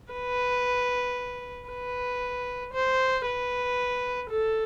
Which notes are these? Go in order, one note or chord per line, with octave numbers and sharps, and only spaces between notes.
B4
B4
C5
B4
A4